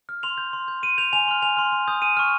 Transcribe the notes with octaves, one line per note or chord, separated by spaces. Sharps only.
F6
C6 F7
G6
C6
G6
C6 D#7
G6 F7
G#5 F7
C6 F6
G#5 F7
C6 F6
C6
D#6 G6
G#5 D#7
C#6 F6